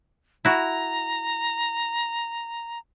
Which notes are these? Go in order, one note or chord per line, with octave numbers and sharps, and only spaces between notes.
E4 F#4 A#5